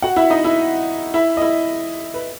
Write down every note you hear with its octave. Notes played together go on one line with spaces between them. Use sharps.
F#4 F#5
E4 E5
D#4 D#5
E4 E5
E4 E5
D#5
E4 E5
B4